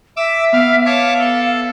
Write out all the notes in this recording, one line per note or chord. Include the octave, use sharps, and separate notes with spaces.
E5 D6 E6
B3 F5
C#5 F5 A5 D6
A4